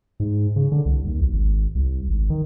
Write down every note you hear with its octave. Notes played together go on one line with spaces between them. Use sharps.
G#2
C#3
D3
C2
D#2
B1
G#1
C2
G#1
D#3